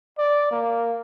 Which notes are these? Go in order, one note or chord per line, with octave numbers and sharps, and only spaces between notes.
D5
A#3